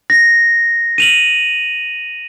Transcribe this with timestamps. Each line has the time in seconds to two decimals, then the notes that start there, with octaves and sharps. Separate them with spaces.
0.10 A#6
0.98 D#7 F7 F#7